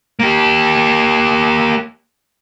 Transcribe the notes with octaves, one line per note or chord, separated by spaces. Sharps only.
A#3 G4